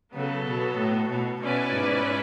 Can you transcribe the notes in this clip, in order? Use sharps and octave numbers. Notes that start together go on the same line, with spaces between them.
C#3 F#3 B3 F#4 A4
B2
A2
B2
B2 C#4 E4 B4 D5
G#2